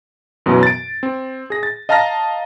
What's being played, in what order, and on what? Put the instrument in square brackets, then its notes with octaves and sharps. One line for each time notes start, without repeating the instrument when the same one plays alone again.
[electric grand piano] F#2 B2 E3 F#3 B3
A6 D7
C4
G#4 A#6
A6
D#5 F5 A5 A#5 F6 A#6